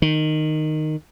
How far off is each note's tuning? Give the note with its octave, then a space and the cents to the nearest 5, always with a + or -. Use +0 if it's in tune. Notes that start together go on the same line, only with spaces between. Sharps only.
D#3 -10